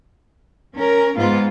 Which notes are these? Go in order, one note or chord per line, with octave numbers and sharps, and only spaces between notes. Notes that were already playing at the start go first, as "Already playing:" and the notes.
C#4 A#4
G#2 B3 F4